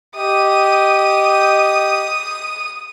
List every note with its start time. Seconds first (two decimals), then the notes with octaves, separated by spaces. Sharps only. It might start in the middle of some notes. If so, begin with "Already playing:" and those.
0.17 G4 D#5 D#6